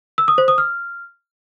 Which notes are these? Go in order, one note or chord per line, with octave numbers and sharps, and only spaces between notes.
E6
D#6
C5
D#6
F6